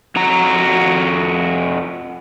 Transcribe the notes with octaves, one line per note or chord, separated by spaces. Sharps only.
F2 F#4 A#5